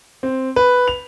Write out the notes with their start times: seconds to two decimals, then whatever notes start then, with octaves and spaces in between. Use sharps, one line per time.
0.23 C4
0.56 B4
0.88 F7